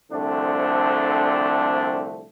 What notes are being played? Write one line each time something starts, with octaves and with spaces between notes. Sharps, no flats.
C2 D3 F3 A3 C4 D4